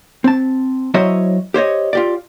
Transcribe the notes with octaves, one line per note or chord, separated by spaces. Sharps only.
C4 A5
F#3 E4 C5 C#5 D#5 E5
G4 C5 C#5 D#5
F4 G4 D5